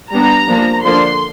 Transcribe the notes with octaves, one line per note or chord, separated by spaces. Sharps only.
G3 B3 D4 A#5
F3 A#3 D4
D3 F3 A#3 D4 C6